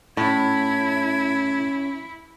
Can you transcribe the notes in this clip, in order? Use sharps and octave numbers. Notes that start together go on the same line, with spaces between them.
A2 C#4 E4 G#6